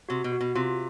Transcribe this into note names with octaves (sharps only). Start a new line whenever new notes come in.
C3 F#4
B2
F#4
B2
C3 F4